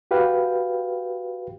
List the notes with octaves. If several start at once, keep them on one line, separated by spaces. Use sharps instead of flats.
F#4 G4 B4 F5 G5